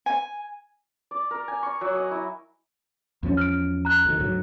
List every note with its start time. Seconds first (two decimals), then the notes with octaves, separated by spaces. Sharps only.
0.06 G#5
1.11 D5
1.31 A#4
1.48 G#5
1.63 C#6
1.81 F#3
1.96 D#5
2.11 E4
3.23 E2 F3 C#4
3.37 F6 D7
3.85 A#5 F#6
4.05 D2 D#3
4.20 D2 G#2 F#3